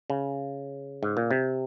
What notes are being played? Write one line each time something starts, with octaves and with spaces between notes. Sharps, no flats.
C#3
G#2
A#2
C3